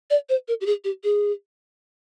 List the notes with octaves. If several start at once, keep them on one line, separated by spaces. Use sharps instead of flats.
D5
C5
A#4
G4
G#4
G4
G#4